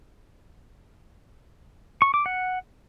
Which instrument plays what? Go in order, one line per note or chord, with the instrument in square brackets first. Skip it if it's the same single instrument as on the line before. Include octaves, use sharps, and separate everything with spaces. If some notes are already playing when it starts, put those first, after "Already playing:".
[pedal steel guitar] C#6
D6
F#5